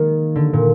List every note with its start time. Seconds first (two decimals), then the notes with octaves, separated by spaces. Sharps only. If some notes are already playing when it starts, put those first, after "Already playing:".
Already playing: D#3 G#3 A#3
0.36 D3
0.53 A#2